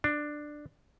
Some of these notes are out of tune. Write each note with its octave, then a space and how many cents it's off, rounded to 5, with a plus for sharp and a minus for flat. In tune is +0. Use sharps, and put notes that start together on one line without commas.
D4 +10